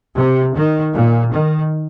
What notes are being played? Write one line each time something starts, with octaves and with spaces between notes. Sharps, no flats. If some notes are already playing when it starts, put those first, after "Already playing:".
C3
D#3
A#2
D#3